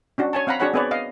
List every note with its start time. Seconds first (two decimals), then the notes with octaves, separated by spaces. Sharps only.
0.18 C#4 D4 F#4
0.33 C#5 G#5 A5
0.47 C4 F5 F#5 A#5 B5
0.60 D4 F#4 G#4 C#5 F#5 B5
0.74 B3 C4 G#4 B4 C#5 D5
0.91 D#5 F5